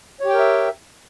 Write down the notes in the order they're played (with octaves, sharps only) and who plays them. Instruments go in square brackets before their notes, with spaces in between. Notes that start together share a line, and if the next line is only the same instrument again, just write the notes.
[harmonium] C#5
G4
G5
A#4
E5